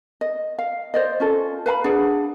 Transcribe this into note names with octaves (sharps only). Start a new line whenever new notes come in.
D#5
F5
C5 D5 D#5
C#4 F4 A4
B4 F5 A#5 B5
D4 G#4 F#5